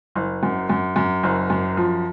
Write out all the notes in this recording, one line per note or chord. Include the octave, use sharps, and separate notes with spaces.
F#1
F#2
F#2
F#2
F#1
F#2
F3